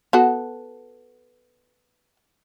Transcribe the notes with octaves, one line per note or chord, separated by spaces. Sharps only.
B3 F#4 A4